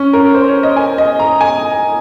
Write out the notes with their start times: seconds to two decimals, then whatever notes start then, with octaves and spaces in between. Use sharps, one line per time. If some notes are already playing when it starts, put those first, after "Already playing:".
Already playing: C#4
0.13 A#4
0.34 C5
0.49 C#5
0.63 D#5
0.76 G#5
0.98 D#5
1.20 A#5
1.41 G#5